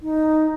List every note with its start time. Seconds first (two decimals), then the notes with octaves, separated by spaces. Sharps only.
0.02 D#4